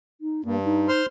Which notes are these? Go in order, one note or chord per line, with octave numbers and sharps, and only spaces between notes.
D#4
G2 A#3
D#4
C5 C6 F6